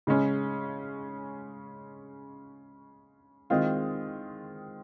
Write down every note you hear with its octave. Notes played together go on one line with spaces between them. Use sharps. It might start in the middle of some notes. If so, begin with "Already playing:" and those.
C#3 G#3 C#4
D#3 G#3 C4 F4